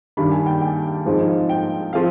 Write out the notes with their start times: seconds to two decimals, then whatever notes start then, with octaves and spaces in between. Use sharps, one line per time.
0.17 G2 D#3 G3 D4 B5
0.32 G#5
0.46 G5
0.62 G5
1.05 G#2 F3 C4 D#4
1.49 G5
1.93 F3 C4 F5